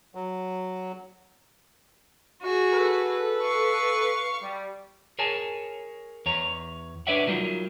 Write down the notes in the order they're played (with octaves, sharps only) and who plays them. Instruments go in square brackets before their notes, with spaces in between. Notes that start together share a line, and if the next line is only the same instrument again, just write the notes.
[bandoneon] F#3
[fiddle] F#4 G#4
[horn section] A4 B4
[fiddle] F5 C#6
[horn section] G3
[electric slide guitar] G#4 A#4 C#5 G#5 A5
E2 C#5 A#5
D4 B4 C#5 D5 E5 F#5
F#3 G3 D#4 F4 A#4